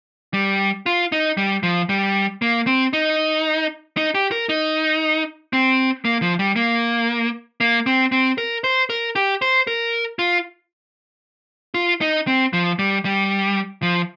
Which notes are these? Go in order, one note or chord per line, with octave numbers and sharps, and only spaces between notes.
G3
F4
D#4
G3
F3
G3
A#3
C4
D#4
D#4
G4
A#4
D#4
C4
A#3
F3
G3
A#3
A#3
C4
C4
A#4
C5
A#4
G4
C5
A#4
F4
F4
D#4
C4
F3
G3
G3
F3